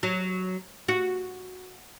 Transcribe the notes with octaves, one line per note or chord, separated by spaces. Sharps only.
F#3
F#4